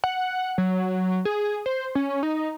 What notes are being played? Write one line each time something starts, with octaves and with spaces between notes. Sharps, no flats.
F#5
F#3
G#4
C5
C#4
D#4